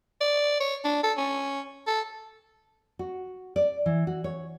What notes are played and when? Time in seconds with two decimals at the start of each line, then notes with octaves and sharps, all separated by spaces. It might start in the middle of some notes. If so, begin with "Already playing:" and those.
0.21 D5
0.60 C#5
0.84 D4
1.03 A4
1.18 C#4
1.87 A4
2.99 F#4
3.56 D5
3.86 E3
4.07 F#4
4.24 C#5